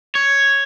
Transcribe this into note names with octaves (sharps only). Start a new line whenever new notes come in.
C#5